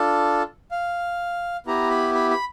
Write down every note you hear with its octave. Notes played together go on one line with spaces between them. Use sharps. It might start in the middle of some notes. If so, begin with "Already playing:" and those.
Already playing: D4 F4 A4
F5
B3 E4 G4 A#5
B5
B5
B5